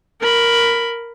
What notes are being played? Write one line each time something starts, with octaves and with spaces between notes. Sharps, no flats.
A#4 B5